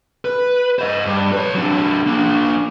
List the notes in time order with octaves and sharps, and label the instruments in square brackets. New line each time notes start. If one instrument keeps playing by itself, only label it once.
[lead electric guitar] B4
C5 D#5
G2
B4 C#5
F#3 D4
A#3 D4